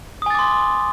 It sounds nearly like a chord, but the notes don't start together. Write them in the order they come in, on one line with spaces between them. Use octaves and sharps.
D#6 G#5 A6 D6 C6